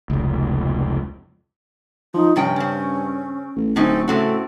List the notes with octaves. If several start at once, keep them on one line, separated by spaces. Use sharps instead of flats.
F1 C#2
F3 D#4
G2 C3 F3 C#4 G5
C#3 C4
A1
D1 A2 C4 C#4 D#4
A2 C#3 A3 C4 F#4